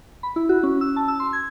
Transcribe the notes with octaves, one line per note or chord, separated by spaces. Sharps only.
B5
E4
F#4
C#4
E6
A5
E6
C6
G#6